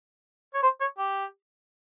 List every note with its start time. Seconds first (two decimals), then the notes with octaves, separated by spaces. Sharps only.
0.54 C#5
0.62 C5
0.81 C#5
0.98 G4